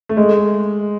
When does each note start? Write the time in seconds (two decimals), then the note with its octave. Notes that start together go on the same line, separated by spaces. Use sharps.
0.09 A3
0.17 G#3